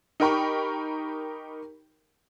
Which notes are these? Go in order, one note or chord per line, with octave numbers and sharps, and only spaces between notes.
D#4 G4 A#4 G5 B5 C#6